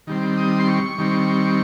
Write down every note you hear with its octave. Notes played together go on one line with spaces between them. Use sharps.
D#3 G3 C4
D#6
C6
C#6
D#3 G3 C4